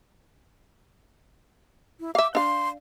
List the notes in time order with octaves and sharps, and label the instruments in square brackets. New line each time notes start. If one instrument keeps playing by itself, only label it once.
[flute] E4
[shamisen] E5 F5 [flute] D6
[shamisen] D4 F5 [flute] C6